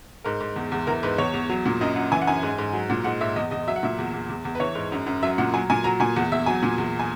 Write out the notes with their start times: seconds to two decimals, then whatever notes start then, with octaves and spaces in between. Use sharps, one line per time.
0.24 G#2 A#4
0.41 G#2
0.56 E2
0.72 E2
0.87 E3 A#4
1.03 G#2 B4
1.18 E2 C#5
1.34 E2
1.49 F#3
1.66 A#2
1.81 F#2 D#5
1.96 F#2 F#5
2.12 E3 G#5
2.22 F#5
2.27 F#2 G#5
2.43 G#2
2.59 G#2
2.73 F#3
2.90 A#2
3.04 G#2 F#5
3.21 G#2 E5
3.36 E2 D#5
3.51 E2 D#5
3.67 F#3 E5
3.76 F#5
3.83 A#2 E5
3.99 E2
4.13 E2
4.29 E2
4.45 E2
4.55 B4
4.60 E3 C#5
4.75 G#2
4.92 F#2
5.06 F#2
5.23 F#3 E5
5.38 A#2 F#5
5.54 F#3 G#5
5.70 A#2 G#5
5.84 F#3 A#5
6.00 A#2 G#5
6.16 E2 F#5
6.32 E2 E5
6.46 F#3 G#5
6.63 A#2
6.78 E2
6.99 G#5